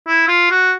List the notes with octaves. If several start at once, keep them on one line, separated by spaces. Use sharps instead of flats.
E4
F4
F#4